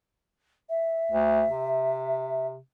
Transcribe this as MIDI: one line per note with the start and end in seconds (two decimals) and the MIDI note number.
0.69 2.46 76
1.12 1.44 38
1.50 2.58 48